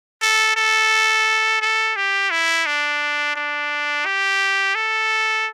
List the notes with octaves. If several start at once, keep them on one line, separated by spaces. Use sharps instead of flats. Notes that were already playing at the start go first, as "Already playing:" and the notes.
A4
A4
A4
G4
E4
D4
D4
G4
A4